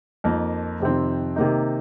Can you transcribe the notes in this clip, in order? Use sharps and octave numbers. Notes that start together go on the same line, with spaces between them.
F2 F3 A#3 D#4 A#4
F2 C3 D#3 C4
C3 D#3 A#3 D#4